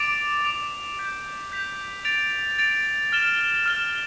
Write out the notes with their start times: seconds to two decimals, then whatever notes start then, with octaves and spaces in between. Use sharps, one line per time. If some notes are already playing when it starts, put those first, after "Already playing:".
Already playing: D6 A6 D7 F7
0.45 D6 A6 D7 F7
0.99 G6 B6 F7
1.52 G6 B6 F7
2.05 A6 D7 F7
2.59 A6 D7 F7
3.12 F6 A6 E7 G7
3.66 F6 A6 E7 G7